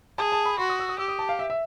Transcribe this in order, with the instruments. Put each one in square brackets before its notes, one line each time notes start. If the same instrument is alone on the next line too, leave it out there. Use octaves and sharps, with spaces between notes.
[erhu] G#4 [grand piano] A5
[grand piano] A5
B5
[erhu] F#4 [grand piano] C6
[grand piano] D#6
E6
D#6
[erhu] G4 [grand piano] E6
[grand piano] D#6
A5
F5
E5
E5